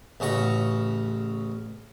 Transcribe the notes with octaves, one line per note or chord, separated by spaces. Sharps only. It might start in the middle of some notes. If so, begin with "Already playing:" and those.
A1 C#3 F#4 C#6